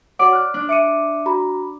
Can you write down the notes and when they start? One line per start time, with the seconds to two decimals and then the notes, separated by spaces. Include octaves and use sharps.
0.19 F#4 C#5 D5 F#5 D6
0.33 F6 F#6
0.54 D4
0.69 E5 D6 C#7 D#7
1.26 F#4 A#5 B5